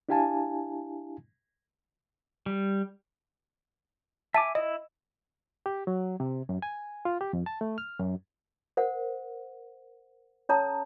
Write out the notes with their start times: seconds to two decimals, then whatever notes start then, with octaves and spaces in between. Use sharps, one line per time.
0.09 D4 E4 G4 F5 G#5 A5
2.46 G3
4.34 E5 G#5 A5 D6
4.55 E4 D#5
5.66 G4
5.87 F#3
6.20 C3
6.49 F#2
6.62 G#5
7.05 F4
7.21 G4
7.33 F2
7.46 A5
7.61 A3
7.78 F6
8.00 F#2
8.77 A#4 C5 F#5
10.49 C#4 A4 C#5 A5 A#5 D#6